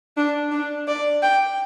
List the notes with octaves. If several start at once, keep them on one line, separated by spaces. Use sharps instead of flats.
D4
D4
D5
G5